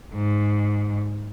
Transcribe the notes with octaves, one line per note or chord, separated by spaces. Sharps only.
G#2